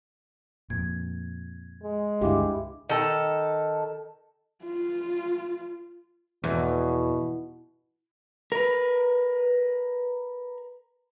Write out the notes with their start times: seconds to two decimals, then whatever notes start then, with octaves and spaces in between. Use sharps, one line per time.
0.70 F2 A#2 G#6
1.83 G#3
2.22 C#2 G2 D3 D4 E4 G4 F5 D6
2.89 D#3 A4
4.64 F4
6.44 E2 B2
8.52 A#4 B4